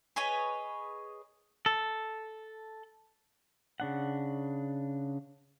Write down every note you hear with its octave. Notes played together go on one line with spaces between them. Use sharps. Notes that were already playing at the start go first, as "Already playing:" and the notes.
G#4 B4 C#5 D#5
A4
C#3 D4 F#5